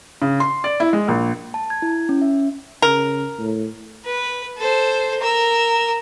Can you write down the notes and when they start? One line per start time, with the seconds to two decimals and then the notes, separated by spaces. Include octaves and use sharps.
0.22 C#3
0.40 C6
0.64 D5
0.80 E4
0.93 G#3
1.08 A#1
1.54 A5
1.70 G#6
1.82 E4
2.09 C#4
2.22 E5
2.82 C#3 A#4
3.39 A2
4.05 B4
4.57 A4 C5
5.20 A#4 E6